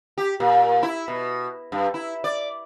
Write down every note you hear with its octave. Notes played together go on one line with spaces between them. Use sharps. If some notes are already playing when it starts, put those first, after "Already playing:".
G4
A#2
E4
B2
G2
E4
D5